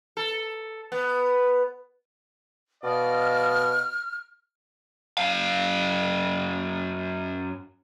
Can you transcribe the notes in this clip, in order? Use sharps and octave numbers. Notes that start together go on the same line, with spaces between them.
A4
B3
B2 D5 D#5 F5 F6
F#2 F5